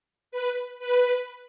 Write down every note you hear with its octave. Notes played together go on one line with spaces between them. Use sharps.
B4
B4